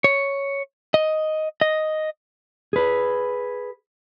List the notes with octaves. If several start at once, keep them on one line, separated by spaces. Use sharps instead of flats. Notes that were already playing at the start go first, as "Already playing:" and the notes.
C#5
D#5
D#5
G#4 B4